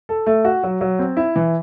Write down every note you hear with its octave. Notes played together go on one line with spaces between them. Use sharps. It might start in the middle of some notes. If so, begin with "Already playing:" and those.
A4
A3
F#4
F#3
F#3
C4
E4
E3